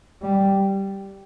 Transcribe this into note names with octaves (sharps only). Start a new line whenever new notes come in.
G3